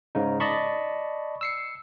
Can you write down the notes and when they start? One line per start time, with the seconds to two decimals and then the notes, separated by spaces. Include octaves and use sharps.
0.15 G#2 C#3 D#4
0.40 D5 D#5 A5 B5 C#6
1.41 E6 C7 C#7